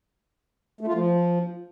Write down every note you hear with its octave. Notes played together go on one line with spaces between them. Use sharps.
A3
F4
F3